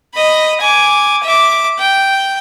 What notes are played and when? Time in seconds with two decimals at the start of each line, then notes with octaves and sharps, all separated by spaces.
0.14 D#5 B5
0.60 G#5 D6
1.24 E5 D6
1.79 G5